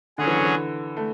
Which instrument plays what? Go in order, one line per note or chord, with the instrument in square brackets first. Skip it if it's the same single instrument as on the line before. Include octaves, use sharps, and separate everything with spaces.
[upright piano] D3 [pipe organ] F#3 C#4 G#4
[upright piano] E3
D3
E3
A3